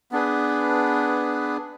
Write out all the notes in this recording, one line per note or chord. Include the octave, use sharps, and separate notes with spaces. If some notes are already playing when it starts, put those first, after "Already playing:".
B3 D4 G#4 B4